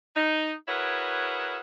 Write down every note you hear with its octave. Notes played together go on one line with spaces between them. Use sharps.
D#4
E4 F#4 G#4 A#4 B4 C#5